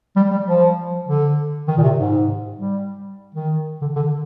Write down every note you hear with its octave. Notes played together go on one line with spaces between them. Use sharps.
G3
G3
F3
D3
D#3
A#2
C3
G#2
G3
D#3
D3
D3